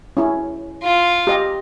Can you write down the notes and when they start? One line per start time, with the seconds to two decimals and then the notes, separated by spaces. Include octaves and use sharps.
0.17 C#4 E4
0.82 F4
1.27 G4 D#5